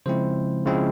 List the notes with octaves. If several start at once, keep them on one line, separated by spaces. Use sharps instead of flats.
C#3 F3 G#3 C4 E4 C5
C#3 F3 G#3 C4 E4